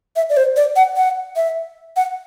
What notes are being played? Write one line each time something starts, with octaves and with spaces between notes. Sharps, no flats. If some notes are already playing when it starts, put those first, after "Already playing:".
E5
D5
C5
D5
F#5
F#5
E5
F#5